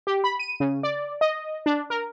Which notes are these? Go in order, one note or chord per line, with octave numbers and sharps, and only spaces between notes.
G4
B5
D#7
C#3
D5
D#5
D4
A#4